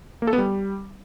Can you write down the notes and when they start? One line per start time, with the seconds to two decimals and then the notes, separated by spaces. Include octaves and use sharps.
0.22 A#3
0.27 A4
0.33 B3
0.38 G3